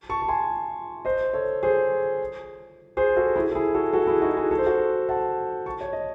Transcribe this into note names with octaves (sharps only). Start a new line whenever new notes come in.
A5 C#6
A5
G#5 C6
C5 D#5
A4 C#5
G#4 C5
G#4 C5
F#4 A4
E4 G#4
A4
E4 G#4
F#4 A4
F#4 A4
E4 G#4
D#4 F#4
E4 G#4
A4
C5
F#4 A4
F#5 A5
A5 C#6
C#5
D#5